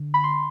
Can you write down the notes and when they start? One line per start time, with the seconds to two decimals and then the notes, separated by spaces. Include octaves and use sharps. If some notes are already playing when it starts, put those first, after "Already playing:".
Already playing: D3
0.14 B5
0.24 C6